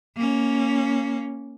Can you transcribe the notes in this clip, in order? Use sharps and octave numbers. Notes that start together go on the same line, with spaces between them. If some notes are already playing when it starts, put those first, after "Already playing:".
A#3 C#4